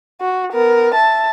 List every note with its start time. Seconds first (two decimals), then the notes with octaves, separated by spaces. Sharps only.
0.21 F#4
0.53 B3 A#4
0.94 E5 A5